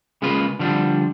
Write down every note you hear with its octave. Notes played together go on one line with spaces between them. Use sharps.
C#3 G#3 A#3 F4 B4
D3 F3 G3 D4